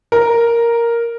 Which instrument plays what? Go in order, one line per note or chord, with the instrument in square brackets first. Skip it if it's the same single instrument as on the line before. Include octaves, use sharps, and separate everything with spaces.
[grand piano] A#4